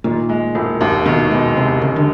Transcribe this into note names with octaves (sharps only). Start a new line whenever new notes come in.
A#2 D#3
G#3
E1
D#2
B2 D#3
B2 G#3
E1 C3
D#2 C#3
D3